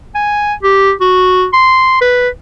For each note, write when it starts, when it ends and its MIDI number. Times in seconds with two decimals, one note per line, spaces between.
0.15 0.54 80
0.63 0.93 67
1.01 1.46 66
1.53 1.98 84
2.01 2.29 71